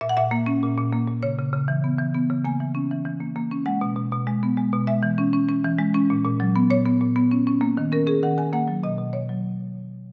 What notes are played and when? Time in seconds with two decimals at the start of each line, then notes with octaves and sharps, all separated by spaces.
0.01 A#2 E5
0.09 F#5
0.17 A#2 E5
0.31 A#3
0.46 C#4
0.63 A#2
0.78 A#2
0.93 A#3
1.08 A#2
1.23 C#3 C#5
1.39 C#3
1.53 C#3
1.68 E3
1.84 B3
1.99 E3
2.14 B3
2.30 C#3
2.45 A#3 G#5
2.60 E3
2.75 C#4
2.91 E3
3.05 E3
3.21 A#3
3.36 A#3
3.52 C#4
3.66 G#3 F#5
3.81 B2
3.96 B2
4.12 B2
4.27 G#3
4.43 B3
4.57 G#3
4.73 B2
4.87 G#3 E5
5.03 E3
5.18 C#4
5.33 C#4
5.49 C#4
5.64 E3
5.79 G#3
5.94 C#4
6.10 A#2
6.25 A#2
6.40 F#3
6.56 B3
6.70 A#2 C#5
6.86 B3
7.01 A#2
7.16 B3
7.31 C#4
7.47 C#4
7.61 A#3
7.77 D#3
7.92 C#4 A#4
8.07 C#4 G#4
8.23 D#3 F#5
8.38 D#3 G#5
8.53 A#3 F#5
8.68 F#3
8.83 B2 D#5
8.98 B2
9.13 B2 C#5
9.29 F#3